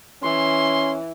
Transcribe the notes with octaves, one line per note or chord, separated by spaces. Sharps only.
E3 C#4 C6